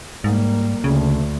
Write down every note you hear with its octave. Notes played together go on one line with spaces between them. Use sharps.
G#2 G3 A#3
D2 C#3